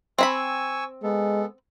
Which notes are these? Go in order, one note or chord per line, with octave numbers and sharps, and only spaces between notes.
C4 E5 G#5 B5 C#6 E6
G#3 B3 A4